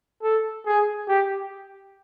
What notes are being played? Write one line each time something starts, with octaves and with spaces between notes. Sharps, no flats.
A4
G#4
G4